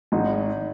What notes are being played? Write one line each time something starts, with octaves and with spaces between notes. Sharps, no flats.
G#1 D#4